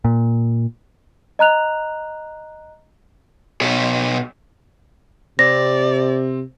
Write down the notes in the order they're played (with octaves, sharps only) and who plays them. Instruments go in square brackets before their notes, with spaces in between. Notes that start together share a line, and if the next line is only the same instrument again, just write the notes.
[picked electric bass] A#2
[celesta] D#5 A#5 F#6 F7
[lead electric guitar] B2 C#5
[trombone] C3 [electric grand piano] C4 [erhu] D5 [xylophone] A#6